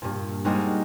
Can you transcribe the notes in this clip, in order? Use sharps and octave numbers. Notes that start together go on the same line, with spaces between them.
G2 A#2
G3 G#3 A#3 C4 D#4 F#4